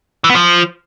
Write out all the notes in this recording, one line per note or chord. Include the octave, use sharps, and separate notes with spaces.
E3
B3
F3